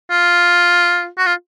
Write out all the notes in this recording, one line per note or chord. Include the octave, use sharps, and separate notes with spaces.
F4
F#4
F4